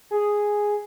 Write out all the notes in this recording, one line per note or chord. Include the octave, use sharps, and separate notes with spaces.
G#4